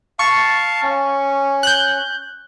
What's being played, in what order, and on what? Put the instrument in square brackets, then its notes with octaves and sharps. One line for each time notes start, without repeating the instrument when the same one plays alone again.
[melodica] F5 A5 [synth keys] C#6
[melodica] C#4
[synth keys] F#6 G6